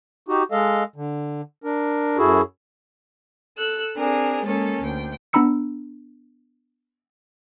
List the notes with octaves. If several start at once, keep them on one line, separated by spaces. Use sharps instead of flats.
D#4 F#4 G4
G#3 A4 D#5 F5
D3
D4 A#4
F#2 E4 F#4 G#4 A4
A4 E6 F#6
C4 D4 G#4 A#4
G#3 A#3 C#4 A4
D2 G5
B3 D4 A#5 B5 E6 C#7